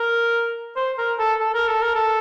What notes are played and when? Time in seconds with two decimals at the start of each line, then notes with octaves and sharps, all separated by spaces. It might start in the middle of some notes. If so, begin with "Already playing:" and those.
Already playing: A#4
0.76 C5
0.98 A#4
1.19 A4
1.40 A4
1.54 A#4
1.68 A4
1.82 A#4
1.95 A4